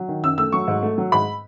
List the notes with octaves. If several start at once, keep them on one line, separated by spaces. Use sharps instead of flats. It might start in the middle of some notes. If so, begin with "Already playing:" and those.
Already playing: F#3
D#3
F#2 E6
A3 E6
F#3 C#6
G#2
A3
F#3
G#2 B5